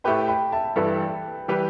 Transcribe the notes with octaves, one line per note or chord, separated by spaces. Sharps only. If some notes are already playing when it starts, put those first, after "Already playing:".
A2 A3 G4 B4 G5 B5
G5 B5
E5 A5
G2 E3 G3 E4 A4 B4 E5
E3 G3 E4 G4 B4